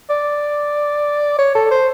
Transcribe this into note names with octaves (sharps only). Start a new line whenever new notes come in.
D5
C#5
A4
C5